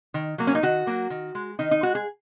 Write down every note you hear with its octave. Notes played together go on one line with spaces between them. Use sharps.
D#3
F#3 A#3
C#4
D#4
D#3 F#4
F#3 A#3
D#3
G#3
D#3 D#4
D#4
G#3 F#4
G#4